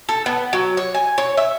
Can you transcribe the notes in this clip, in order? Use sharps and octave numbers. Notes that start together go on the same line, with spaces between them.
A4
B3
F#3
C#5
G#5
C#5
E5